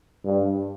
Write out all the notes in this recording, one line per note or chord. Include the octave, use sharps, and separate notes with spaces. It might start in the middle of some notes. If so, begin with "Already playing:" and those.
G2